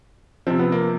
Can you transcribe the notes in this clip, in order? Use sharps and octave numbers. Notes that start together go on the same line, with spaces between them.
C3 F3 C4
B3
A#3